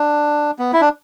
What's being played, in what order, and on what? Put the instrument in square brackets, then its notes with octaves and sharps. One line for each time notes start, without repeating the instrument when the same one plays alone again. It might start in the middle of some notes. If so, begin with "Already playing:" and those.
Already playing: [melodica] D4
B3
E4
D4